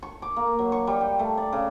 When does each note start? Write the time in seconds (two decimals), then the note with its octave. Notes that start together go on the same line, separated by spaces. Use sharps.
0.03 C#6
0.22 D6
0.36 A#3
0.59 F#3
0.72 C#6
0.87 G3
1.01 G5
1.19 A3
1.38 D5
1.52 C#3